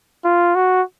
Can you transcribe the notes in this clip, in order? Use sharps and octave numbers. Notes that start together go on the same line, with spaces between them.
F4
F#4